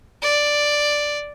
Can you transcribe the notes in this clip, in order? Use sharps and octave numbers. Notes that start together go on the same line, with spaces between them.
D5